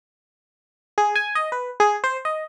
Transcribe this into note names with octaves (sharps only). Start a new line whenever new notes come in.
G#4
G#5
D#5
B4
G#4
C5
D#5